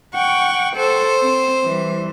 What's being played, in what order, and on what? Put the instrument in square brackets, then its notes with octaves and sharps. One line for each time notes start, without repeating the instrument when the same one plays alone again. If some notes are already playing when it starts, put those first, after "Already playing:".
[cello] F#5 G5 [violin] C#6
[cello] A4 [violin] C5
[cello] C4
E3 G3